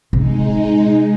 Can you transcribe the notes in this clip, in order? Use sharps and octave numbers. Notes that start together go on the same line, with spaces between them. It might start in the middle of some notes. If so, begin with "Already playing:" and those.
C3 G#3 D#4